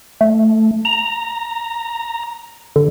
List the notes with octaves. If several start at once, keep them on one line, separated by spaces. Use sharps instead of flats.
A3
A#5
D3